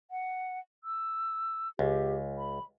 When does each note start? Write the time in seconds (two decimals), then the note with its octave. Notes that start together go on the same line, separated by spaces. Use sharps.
0.11 F#5
0.84 E6
1.79 C#2 G4
2.37 B5